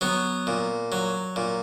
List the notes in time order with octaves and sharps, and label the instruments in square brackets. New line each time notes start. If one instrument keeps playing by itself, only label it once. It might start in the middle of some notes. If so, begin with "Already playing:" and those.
[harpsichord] F#3 B3
A#2
F#3
A#2